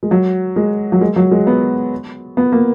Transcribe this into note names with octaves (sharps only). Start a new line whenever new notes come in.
G#3
F#3
G#3
F#3
G#3
F#3
G#3
B3
B3
A#3